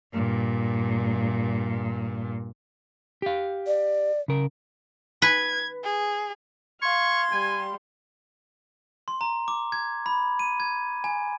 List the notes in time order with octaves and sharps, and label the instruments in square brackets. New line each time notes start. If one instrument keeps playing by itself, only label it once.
[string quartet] G2 A#2
[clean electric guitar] G4 F5
[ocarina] D5
[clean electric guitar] C#3 A#4
[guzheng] B4 [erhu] G#6
[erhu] G#4
[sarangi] F5 [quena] C6 [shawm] C#6 [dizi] G#6
[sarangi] G3 [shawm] G#5
[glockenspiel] C6
A#5
D6
G#6
B5
D#7
G#6
G#5